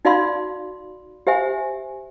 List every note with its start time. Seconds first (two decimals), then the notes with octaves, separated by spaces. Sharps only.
0.05 D#4 F#4 D5 F5 B5 C6
1.27 G4 C5 E5 G#5